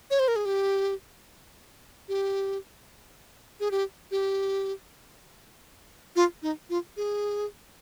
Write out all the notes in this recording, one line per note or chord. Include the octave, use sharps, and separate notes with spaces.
C#5
C5
A#4
G#4
G4
G4
G#4
G4
G4
F4
D#4
F4
G#4